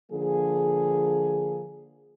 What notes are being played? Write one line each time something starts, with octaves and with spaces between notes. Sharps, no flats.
D3 F3 A#3 G#4